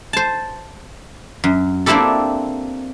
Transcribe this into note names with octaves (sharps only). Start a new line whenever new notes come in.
C5 A5
F#2
A#3 C4 D4 E4 G4 A4